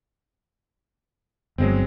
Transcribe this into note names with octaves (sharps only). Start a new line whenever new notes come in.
G1 F#3 G#3 C4